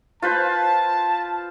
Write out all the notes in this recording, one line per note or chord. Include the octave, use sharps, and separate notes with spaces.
F4 B4 C5 A5